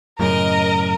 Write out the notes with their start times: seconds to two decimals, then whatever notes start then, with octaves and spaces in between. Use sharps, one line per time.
0.19 F#2 A2 C#3 A#4 D#5 A#6 D7